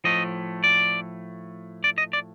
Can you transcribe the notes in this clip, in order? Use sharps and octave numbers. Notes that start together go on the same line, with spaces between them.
A2 F3 A3 D#5
D5
D5
D#5
D5